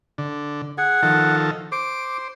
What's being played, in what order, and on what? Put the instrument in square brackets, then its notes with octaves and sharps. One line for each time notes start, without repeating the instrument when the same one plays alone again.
[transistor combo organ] D3
[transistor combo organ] G#4 [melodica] F#5
[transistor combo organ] D#3 F3 A4
[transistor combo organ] C5 [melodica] D6